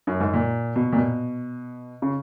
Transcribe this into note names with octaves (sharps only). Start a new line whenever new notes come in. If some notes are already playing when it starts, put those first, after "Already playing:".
F#2
G#2
A#2
B2
A#2
B2
C#3